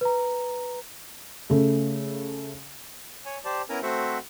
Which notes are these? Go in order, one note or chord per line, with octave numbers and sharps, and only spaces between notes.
B4 A#5
C#3 A3
C#5 G#5
G4 C5 D5 A5
B3 C#4 E4 A#4 G#5 A#5
A3 C4 F#4 C5 E5 F#5